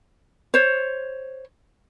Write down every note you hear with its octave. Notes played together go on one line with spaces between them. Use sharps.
C5 C#5